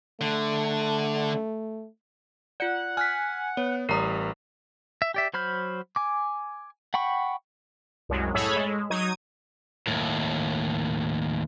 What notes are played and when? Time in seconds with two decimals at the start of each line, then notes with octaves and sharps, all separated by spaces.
0.21 D3 A3
2.60 F4 D5 F#5
2.97 G#5 F6 F#6 B6
3.57 B3 C#5
3.89 A1 G3 A#4 A#5 D#6
5.02 E5
5.14 G4 D5 E5
5.34 F#3 C5 B5 F6 G6
5.96 G#5 D6
6.94 F#5 G5 B5 C#6
8.09 C2 F#2 F#3 G#3
8.34 A2 G#4 A4 C#5 B5 E6
8.56 G#3
8.90 F#3 D#4 D#6 G#6 D#7
9.87 D#2 A2